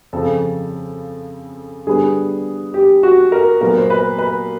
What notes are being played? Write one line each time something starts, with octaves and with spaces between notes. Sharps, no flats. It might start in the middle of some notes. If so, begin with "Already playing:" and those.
F2 C#3 F3 A4
D3 G3 B3 G#4
G4
F#4
A#4
A#2 F#3 B3 A#4
C5
B4
B4